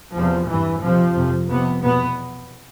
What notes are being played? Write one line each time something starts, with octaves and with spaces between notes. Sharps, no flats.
E2 C3 F3
G2 E3
F2 C3 F3
F2 C3
F2 C3 B3
E2 B2 B3